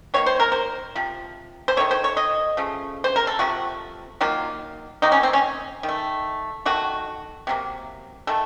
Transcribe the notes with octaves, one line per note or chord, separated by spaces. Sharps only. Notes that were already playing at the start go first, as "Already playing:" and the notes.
D#3 A#3 C#5
C5
A#4
C5
C3 F3
C5
D#3 A3 C#5
C5
C#5
D#5
C#3 F3 A3
C5
A#4
A4
C3 F3 A3 F#4
D#3 F#3 A#3 F4
C3 D#3 A#3 D#4
C#4
C4
C#4
D#3
A3
D#3 A3 F#4
C3 F#3 A#3
D#3 A3 A4